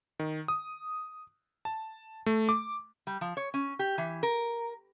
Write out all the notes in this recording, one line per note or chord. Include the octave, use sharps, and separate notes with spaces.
D#3
D#6
A5
A3
D6
G3
F3
C#5
C#4
G4
E3
A#4